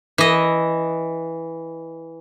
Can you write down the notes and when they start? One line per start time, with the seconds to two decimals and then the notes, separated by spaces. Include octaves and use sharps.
0.18 E3 D#5